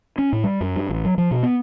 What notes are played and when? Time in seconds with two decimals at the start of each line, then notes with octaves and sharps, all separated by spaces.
0.18 C#4
0.32 A2
0.44 G3
0.61 F#2
0.76 G2
0.89 A1
1.05 F#3
1.18 F3
1.31 B2
1.43 B3